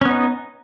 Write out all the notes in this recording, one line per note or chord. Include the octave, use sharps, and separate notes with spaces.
B3 C#4 D#4